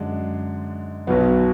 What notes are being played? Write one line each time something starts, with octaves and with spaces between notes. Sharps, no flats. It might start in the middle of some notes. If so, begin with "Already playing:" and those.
Already playing: F#2 D3 G#3 D4
B1 B2 F#3 B3